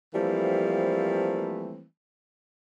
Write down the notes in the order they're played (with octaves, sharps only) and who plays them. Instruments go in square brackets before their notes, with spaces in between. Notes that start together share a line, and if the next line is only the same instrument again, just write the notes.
[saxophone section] E3 F3 G3 A3 A#3 C4